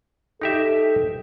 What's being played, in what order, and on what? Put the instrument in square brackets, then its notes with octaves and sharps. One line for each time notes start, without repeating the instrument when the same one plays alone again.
[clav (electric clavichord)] D#4 G4 E5 [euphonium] A4